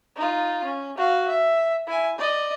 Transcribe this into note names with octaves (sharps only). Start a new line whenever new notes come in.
D#4 F4
C#4
F#4 F5
E5
E4 G#5
D5 D#5